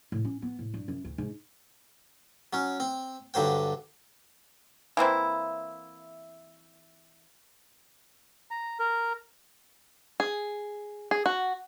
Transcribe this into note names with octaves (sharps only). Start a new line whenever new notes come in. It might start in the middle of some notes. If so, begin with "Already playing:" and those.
A2
C#4
B3
A2
G2
F#2
D2
G#2
F#3 C#4
C4
G2 D3 F#3 C5 G5
E3 A#3 C4 E4
A#5
A#4
G#4
G#4
F#4